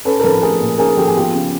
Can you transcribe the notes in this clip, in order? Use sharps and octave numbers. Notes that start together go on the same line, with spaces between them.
C#4 A4 B4
A#4
F3 A4 B4
A3 G#4 A#4
A#2
C#4 G#4 A#4
F3 G4 A4
G#4
B3 F4 G4
C#3